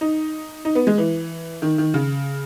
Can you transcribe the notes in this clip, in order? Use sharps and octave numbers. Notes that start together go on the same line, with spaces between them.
D#4
D#4
B3
G#3
E3
D#3
D#3
C#3